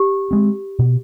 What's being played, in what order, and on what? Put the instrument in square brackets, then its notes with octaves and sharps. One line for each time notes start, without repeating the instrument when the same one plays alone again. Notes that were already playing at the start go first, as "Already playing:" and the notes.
Already playing: [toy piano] G4
[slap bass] G#3 C4
B2